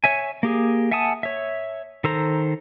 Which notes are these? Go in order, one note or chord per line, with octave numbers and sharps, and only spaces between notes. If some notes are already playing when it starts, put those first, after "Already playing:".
C#5 E5 G#5
A#3 G4 G#4
E5 F#5 G#5 A5 D#6
C#5 E5
D#3 A4 C5 A#5